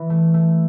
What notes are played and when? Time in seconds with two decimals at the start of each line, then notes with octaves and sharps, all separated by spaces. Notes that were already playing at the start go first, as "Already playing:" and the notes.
Already playing: E3
0.10 A3
0.34 A3